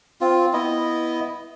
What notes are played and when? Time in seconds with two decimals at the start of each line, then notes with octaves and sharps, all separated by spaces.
0.21 C4 F4
0.53 B3 E4 D#5